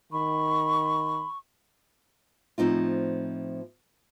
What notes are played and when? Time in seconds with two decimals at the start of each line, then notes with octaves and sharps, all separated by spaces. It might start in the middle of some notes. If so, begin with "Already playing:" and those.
0.12 D#3 B5 C#6
2.58 A2 F3 C4 D#4 F4